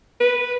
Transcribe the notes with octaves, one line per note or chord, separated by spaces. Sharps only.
B4